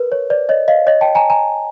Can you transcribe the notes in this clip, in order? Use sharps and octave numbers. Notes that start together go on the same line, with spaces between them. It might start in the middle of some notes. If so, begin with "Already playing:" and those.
Already playing: A#4 B4
C#5
C5 D5
C#5 D#5
D#5 F5
C#5 D#5
G5 A5
G#5 A#5
G#5 A#5